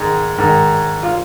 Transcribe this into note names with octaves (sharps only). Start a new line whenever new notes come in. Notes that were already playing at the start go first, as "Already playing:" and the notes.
Already playing: G#2 D#3 G#3
G#2 D#3
F4